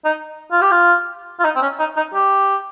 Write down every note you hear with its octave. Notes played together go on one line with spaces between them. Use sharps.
D#4
F4
G4
F4
F4
D#4
C4
C#4
D#4
D#4
G4